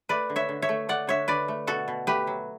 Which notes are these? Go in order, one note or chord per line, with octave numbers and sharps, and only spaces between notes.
A3 B4 D5
D3
C#5 E5
D3
C#5 E5
A3
A3 D5 F#5
D3 C#5 E5
D3 B4 D5
A3
B2 F#4 A4
B2
A3 G4 B4
F#3